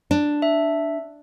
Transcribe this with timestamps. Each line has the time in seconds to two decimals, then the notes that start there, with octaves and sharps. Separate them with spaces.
0.11 D4
0.42 E5